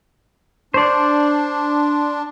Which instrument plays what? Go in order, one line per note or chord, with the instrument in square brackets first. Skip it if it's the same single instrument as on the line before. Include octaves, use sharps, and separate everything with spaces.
[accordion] D4 [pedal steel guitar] C5 D5